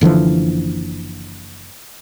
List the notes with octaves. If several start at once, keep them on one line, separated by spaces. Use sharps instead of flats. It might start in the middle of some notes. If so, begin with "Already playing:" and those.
F#1 D3 E3 F3